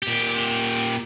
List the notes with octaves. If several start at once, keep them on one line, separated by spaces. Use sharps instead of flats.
A#2 G4